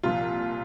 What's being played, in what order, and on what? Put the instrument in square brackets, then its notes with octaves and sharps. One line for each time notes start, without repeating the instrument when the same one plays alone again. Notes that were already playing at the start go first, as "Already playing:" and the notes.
[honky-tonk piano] C2 A#2 F3 F4